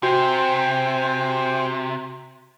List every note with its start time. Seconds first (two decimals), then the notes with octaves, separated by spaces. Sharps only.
0.03 C3 F#4 C5 G5 G#5